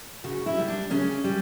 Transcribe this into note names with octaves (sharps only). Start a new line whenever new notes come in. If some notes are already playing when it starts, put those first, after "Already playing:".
C#3 F#4
E4
G3
D4
C#3 C#4
G3